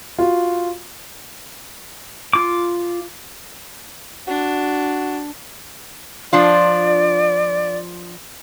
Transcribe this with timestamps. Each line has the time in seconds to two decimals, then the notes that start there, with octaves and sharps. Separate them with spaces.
0.19 F4 F#4
2.33 F4 D6
4.28 D4 F#4
6.33 F3 D4 F4 D5